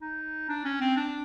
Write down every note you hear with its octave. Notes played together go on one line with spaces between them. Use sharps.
D#4
D4
C#4
C4
D4